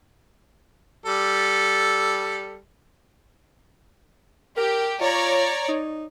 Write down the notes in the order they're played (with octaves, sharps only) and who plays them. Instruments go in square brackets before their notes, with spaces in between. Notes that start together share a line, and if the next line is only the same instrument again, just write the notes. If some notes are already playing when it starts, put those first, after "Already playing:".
[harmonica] G3 A4
[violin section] G4 [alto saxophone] A#4
[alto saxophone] F4 [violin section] C#5 D5 A#5
[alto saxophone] D#4